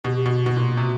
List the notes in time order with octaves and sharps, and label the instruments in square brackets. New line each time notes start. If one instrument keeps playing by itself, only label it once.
[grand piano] B2 [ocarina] G4
[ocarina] G4
[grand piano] B2 [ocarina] F#4
[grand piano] B2
A#2
C3